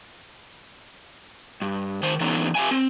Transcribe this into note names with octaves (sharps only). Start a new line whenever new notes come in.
G2
D#3 C5
E3 B3 C#4 D#4 A4
G4 E5 F5 G#5
C4